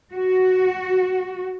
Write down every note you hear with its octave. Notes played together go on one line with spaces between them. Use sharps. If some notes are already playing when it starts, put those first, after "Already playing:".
F#4